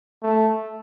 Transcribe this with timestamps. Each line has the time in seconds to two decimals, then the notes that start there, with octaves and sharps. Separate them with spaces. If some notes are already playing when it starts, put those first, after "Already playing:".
0.23 A3